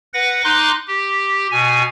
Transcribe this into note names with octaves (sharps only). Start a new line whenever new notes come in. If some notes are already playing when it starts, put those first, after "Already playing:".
B4 F#5 A#6
D#4 C6 D6 F#6
G4
B2 G#5